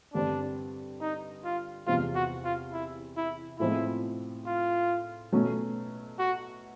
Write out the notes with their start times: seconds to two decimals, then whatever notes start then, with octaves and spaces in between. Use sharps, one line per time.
0.14 G2 D3 G3 C4 D4
1.01 D#4
1.44 F4
1.87 E2 C3 F3 G#3 F4
2.15 F#4
2.44 F4
2.73 E4
3.17 E4
3.59 A2 F3 G#3 C4 E4
4.46 F4
5.32 B2 F#3 A3 C#4
6.19 F#4